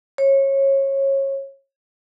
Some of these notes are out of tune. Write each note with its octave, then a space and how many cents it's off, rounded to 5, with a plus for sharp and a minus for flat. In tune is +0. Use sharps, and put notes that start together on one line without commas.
C#5 -25